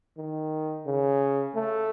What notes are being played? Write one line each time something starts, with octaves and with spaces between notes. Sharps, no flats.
D#3
C#3
A3